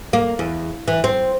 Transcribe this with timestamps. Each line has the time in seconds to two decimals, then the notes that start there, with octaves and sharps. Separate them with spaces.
0.13 A#3
0.39 E2
0.88 E3
1.04 C4